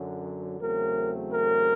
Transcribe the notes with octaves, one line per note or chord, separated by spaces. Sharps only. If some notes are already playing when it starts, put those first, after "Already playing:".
Already playing: F#2 D3 F#3
E2 C#3 F#3 A3 C4 A#4
A#4